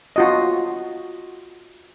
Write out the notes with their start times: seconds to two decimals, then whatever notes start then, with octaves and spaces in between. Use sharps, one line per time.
0.16 F4 F#4 D#5